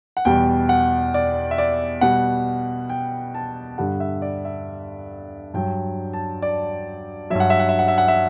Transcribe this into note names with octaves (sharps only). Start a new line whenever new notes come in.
F#5
E2 B2 G3 G5
F#5
D5
E5
D5
B2 G3 F#5
G5
A5
G2 D3 G3 F#5
E5
D5
E5
G2 F#3 G5
A5
D5
G2 F#3 E5
F#5
E5
F#5
E5
F#5
E5
F#5
E5